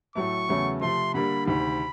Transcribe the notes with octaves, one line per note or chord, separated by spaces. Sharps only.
A2 F#3 A3 C#6
E2 C#3 F#3 A3 C#4
C3 F3 A3 C6
D3 G3 A#3 B5
D2 C3 D#3 B5